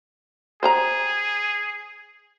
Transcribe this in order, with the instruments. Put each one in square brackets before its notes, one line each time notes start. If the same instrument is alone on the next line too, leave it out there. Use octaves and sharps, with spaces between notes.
[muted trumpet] G#4 [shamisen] C5 G5 A#5